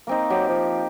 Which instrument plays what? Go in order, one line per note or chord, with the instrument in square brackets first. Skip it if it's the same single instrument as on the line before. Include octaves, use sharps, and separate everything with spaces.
[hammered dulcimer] A#3 C4 D#4
[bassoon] F#3 [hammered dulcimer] G4
[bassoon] F3